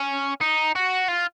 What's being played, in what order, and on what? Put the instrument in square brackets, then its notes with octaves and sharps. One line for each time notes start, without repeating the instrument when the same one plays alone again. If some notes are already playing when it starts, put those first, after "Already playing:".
Already playing: [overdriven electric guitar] C#4
D#4
F#4
F4